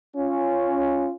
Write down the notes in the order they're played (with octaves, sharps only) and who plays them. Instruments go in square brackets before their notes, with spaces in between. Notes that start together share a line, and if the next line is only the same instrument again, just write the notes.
[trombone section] C#4 F4